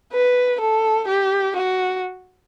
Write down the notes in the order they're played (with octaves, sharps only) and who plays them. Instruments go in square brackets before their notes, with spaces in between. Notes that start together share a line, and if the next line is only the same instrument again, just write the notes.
[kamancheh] B4
A4
G4
F#4